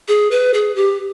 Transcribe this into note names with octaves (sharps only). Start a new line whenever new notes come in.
G#4
B4
G#4
G4